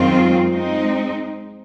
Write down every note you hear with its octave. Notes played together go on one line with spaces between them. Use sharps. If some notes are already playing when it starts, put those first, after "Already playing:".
Already playing: F#2 D#3 G#3 C4 F4
G#3 C4 D#4